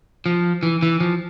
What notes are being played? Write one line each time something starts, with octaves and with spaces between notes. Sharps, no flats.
F3
E3
E3
F3